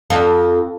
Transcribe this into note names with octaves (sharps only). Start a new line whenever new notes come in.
F2